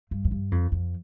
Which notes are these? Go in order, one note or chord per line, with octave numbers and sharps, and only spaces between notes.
G2
F2
G2
F2
F2